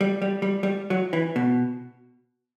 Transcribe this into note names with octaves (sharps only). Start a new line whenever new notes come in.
G3
G3
G3
G3
F#3
E3
B2